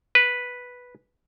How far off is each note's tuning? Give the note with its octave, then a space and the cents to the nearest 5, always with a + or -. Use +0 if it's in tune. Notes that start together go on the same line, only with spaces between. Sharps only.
B4 -5